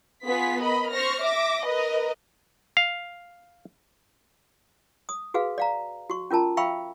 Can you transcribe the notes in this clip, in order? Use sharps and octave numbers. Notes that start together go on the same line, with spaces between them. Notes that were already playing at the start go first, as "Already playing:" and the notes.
B3 F4 G#4 B6
A#4 D#5 B5
C5 C#6 F6 A#6
E5 D6 A#6
A#4 B4 D#5
F5
D#6
F#4 G#4 B4 F5
D5 F5 A#5
F#4 C#6
C#4 F4 A#4 A5 A#5
E5 F5 G5 B5 C#6 E6